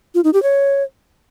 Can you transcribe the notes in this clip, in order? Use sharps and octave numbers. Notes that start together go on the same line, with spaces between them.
F4
D#4
G4
C#5